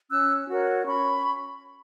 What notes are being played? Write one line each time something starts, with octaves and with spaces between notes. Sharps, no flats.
C#4 E6 F#6
F#4 A#4 C#5
C#4 B5 C#6